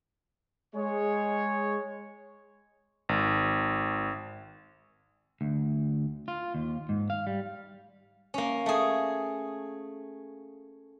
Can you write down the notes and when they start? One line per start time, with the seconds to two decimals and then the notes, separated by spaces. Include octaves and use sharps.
0.75 G#3 C#5
3.09 G#1
5.41 D2
6.28 F4
6.55 D#2
6.89 G#2
7.10 F5
7.27 G3
8.34 A#3 C#4
8.66 A3 G#4